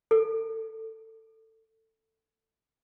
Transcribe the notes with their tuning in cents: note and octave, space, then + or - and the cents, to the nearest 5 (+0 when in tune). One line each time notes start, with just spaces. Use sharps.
A4 +15